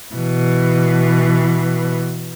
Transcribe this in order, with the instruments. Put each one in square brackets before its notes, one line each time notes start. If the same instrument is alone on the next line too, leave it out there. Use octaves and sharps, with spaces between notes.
[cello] B2 E3